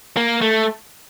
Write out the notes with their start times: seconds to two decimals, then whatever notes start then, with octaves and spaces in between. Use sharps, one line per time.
0.17 A#3
0.41 A3